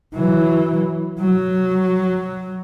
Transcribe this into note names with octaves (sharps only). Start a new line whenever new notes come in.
E3 F#3
F#3